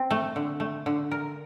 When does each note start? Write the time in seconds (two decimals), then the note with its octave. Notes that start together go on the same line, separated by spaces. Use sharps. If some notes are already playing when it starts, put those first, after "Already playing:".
Already playing: C4
0.11 A3
0.36 D3
0.60 A3
0.86 D3
1.11 A#4